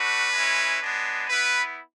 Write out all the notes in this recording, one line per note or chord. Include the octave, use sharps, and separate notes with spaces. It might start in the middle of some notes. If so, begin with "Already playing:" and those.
Already playing: A3 D4 F#4 B4
G#3 C#4 E4
G#3 B3 D4
B3 E4 B4